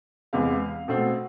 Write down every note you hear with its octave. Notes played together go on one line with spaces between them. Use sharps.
E2 C3 G#3 B3 F5
B2 A3 C4